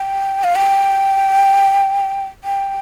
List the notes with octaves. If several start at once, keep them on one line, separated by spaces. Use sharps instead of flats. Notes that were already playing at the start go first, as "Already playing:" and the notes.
Already playing: G5
F5
G5
G5